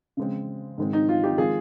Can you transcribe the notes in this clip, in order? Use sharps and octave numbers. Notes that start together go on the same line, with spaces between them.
C#3 G#3 C4
G#2 D#3 G#3 C4
D#4
F4
D#4 G4
D#3 G#3 C4 F4 G#4